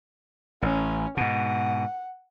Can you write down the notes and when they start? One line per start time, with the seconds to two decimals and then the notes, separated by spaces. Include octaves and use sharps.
0.62 A1 C#4
1.17 G#2 B2 F#5